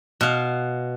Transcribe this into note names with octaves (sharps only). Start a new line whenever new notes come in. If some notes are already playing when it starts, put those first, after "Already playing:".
B2 F5